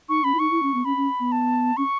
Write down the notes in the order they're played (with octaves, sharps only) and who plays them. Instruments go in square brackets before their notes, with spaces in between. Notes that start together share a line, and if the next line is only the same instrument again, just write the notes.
[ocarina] D#4 [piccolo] C#6
[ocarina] C#4 [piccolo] B5
[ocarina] E4
[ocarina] D#4 [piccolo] C#6
[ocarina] E4
C#4
B3
[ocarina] C#4 [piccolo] B5
[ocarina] C#4
B3
[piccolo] A5
[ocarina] C#4 [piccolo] C#6